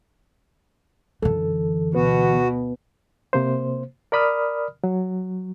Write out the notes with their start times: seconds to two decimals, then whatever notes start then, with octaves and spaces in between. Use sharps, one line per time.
1.22 F#2 D3 E3 A4
1.95 D2 B2 B3 F#4 B4
3.33 C3 A#3 C5
4.12 A#4 D5 B5 D#6 F6
4.84 F#3